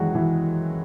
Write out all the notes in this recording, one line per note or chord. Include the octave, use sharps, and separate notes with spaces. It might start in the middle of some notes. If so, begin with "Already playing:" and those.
Already playing: F#2 D#3 E3 F#3 G#3 F#4
E3